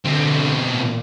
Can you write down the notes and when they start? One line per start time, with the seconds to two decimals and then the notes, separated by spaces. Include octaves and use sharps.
0.05 B2 D3 C4
0.74 A#2